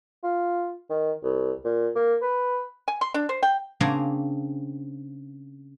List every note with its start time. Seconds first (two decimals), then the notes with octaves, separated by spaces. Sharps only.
0.23 F4
0.90 D#3
1.23 C2
1.65 A#2
1.95 A#3
2.22 B4
2.88 G#5
3.01 C6
3.14 D4
3.29 C5
3.43 G5
3.80 C#3 A#3 C4 D4 G#5 A#5